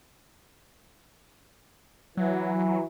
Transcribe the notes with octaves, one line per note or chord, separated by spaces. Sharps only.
E3 F#3